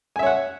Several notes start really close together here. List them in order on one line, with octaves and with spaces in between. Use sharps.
G#5 E5 C#5 F#5